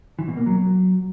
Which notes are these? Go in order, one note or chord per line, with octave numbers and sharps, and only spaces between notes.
E3
B2
A#3
F#3